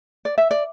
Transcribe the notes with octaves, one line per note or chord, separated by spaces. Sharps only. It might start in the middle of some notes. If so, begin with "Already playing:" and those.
D5
E5
D5